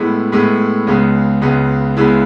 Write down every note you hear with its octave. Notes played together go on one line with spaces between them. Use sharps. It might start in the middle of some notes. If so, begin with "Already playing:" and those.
Already playing: A2 G#3 B3 E4
A2 G#3 B3 E4
C#2 C#3 G#3 B3
C#2 C#3 G#3 B3
C#2 C#3 G#3 B3 E4